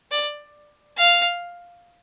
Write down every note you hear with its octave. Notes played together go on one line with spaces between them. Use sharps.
D5
F5